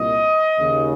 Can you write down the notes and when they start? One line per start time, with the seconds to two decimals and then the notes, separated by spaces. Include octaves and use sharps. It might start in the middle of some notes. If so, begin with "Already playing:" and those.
Already playing: C2 A#2 D#5
0.57 D#2 C#3